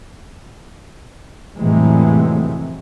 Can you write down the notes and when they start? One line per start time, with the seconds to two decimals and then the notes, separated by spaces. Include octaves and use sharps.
1.58 F2 A2 C3 E3 F#3 G#3